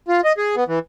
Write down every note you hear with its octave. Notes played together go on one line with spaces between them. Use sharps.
F4
D#5
G#4
B3
E3